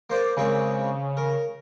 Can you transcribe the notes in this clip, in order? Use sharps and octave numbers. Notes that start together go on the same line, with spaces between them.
A#3 C5 D5
A#2 C#3 G#3 C4
A#4